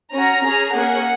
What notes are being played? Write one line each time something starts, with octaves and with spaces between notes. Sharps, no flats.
C#4 F#4 A#5
C#4 G#4
A#3 C#4 G#4 F#5